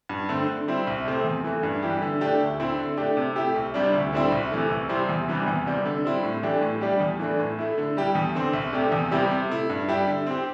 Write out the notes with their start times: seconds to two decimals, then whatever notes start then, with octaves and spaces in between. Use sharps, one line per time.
0.09 G2
0.29 D3 A3 C4
0.48 D3
0.68 G3 C4 E4
0.87 C2
1.05 C3 A3 C4
1.24 E2
1.44 E3 A3
1.63 G2
1.82 E3 G3 E4 G4
2.02 D3
2.21 A3 D4 G4
2.40 D2
2.60 D3 C4 E4
2.79 D3
2.97 A3 D4 G4
3.17 C3
3.36 A3 E4 G4
3.54 C2
3.74 C3 G3 D4
3.94 D2
4.13 D3 G3 C4 E4
4.32 C2
4.52 C3 E3 A3
4.70 C2
4.89 C3 G3 C4 E4
5.09 E2
5.28 C3 E3 G3 D4
5.47 E2
5.66 C3 G3
5.86 D3
6.05 G3 C4 E4
6.24 A2
6.43 E3 A3 D4 G4
6.62 A2
6.81 G3 D4 G4
7.00 E2
7.19 E3 A3 D4
7.39 A2
7.59 A3 E4
7.78 D3
7.97 G3 E4 G4
8.15 E2
8.35 D3 C4
8.53 C2
8.73 C3 A3 D4 G4
8.92 E2
9.11 C3 G3 E4 G4
9.31 C3
9.49 A3 E4
9.70 G2
9.88 G3 E4 G4
10.07 D3
10.26 C4 G4